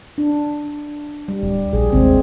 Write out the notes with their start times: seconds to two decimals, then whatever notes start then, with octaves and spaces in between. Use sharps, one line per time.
0.18 D4
1.28 G3
1.43 D1
1.73 A#1 G#4
1.93 G#1 D#2 C3 G#3 C4